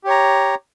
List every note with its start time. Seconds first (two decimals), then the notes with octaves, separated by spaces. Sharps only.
0.04 G4
0.07 C#5
0.10 A#5